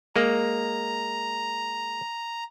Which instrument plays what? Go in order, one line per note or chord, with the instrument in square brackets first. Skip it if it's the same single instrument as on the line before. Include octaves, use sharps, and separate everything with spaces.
[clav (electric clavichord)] G#3 A#3 [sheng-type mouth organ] A#5